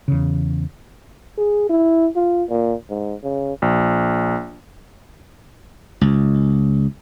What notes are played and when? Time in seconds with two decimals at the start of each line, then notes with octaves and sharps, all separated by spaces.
0.08 E2 C#3
1.38 G#4
1.69 E4
2.16 F4
2.50 A#2
2.90 G#2
3.23 C#3
3.62 A#1
6.01 C#2